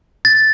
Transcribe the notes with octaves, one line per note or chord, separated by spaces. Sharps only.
A6